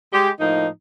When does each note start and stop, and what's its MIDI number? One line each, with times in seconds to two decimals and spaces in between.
0.13 0.29 56
0.13 0.29 67
0.40 0.67 45
0.40 0.67 53
0.40 0.67 58
0.40 0.67 63